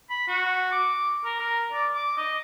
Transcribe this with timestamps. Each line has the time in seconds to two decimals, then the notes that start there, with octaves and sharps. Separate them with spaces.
0.09 B5
0.28 F#4
0.72 D6
1.25 A#4
1.39 A#4
1.72 D5
1.95 D6
2.17 D#5